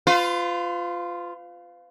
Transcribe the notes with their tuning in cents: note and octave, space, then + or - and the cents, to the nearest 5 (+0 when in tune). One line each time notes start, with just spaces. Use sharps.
F4 +0 B4 +45